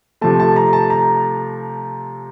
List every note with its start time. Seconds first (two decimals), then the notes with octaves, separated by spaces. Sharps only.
0.21 C3 F3 A3 A5
0.40 A5
0.56 A#5
0.73 A5
0.90 A#5